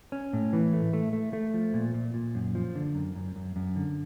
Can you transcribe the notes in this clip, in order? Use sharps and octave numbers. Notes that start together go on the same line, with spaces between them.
C#4
A2
E3
A3
A3
A3
A3
F3
A#2
A#2
A#2
F#2
F3
D3
F#2
F#2
F#2
F#2
D3